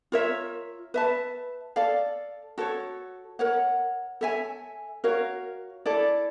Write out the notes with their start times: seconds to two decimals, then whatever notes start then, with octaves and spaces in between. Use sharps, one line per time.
0.12 F4 A#4 C#5 E5
0.94 B4 E5 A5
1.76 A4 D5 F5
2.58 F#4 A4 C#5
3.39 A#4 C#5 F#5
4.21 A4 C#5 E5 G#5
5.04 F#4 A#4 C#5 F5
5.86 E4 A4 D5